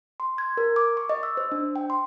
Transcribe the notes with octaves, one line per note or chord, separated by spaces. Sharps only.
C6
G#6
A#4
D6
C#6
D#5
E6
C5
D4
G5
C6